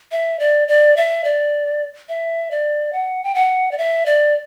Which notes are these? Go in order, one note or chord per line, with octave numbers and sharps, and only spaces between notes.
E5
D5
D5
E5
D5
E5
D5
F#5
G5
F#5
D5
E5
D5